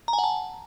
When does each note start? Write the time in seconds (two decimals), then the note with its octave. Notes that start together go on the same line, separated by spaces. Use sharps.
0.08 A#5
0.13 G#5
0.18 F#5
0.24 A5